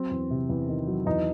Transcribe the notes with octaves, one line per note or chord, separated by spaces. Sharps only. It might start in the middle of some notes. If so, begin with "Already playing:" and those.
Already playing: F#3 C4
E2
C3
E2
D#3
F#3
E2 D#4